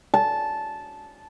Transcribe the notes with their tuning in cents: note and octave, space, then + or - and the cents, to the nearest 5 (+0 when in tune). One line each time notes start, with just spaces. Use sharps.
A5 -10